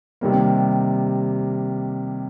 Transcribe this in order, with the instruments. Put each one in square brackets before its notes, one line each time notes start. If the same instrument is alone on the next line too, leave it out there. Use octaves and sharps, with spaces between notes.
[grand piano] C3 D#3 G3 A#3